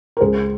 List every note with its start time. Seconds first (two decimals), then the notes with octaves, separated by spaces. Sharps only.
0.17 A#4
0.21 C#2 G#4 C5